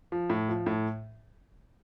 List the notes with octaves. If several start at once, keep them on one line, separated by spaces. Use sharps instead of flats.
F3
A2
F3
A2